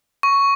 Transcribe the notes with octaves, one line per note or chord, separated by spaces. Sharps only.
C#6